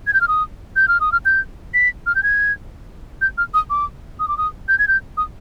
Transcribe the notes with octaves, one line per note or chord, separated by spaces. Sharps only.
G#6
G6
F6
D#6
G6
F6
D#6
F6
G6
B6
F6
G6
G#6
G6
F6
D#6
D6
D#6
D6
D#6
G6
G#6
G6
D#6